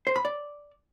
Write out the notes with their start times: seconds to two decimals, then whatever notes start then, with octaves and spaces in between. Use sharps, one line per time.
0.07 C5
0.16 B5
0.25 D5